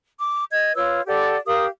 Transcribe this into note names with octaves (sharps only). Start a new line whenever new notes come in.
D6
D#5 G#6
F4 B4 C#5 E6
G4 A4 D5 F#5
G4 A#4 F5 D#6